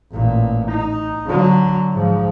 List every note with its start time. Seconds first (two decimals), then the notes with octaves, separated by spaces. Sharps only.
0.12 A1 A#2
0.72 D#4
1.27 D3 F#3
1.93 G#2 F3